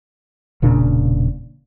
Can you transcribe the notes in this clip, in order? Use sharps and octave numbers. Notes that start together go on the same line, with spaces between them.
E1 A#2 C#3 D4